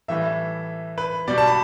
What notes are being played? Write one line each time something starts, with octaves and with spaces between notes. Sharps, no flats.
A2 E3 G3 E5
B4
B2 G3 D5
A5
B5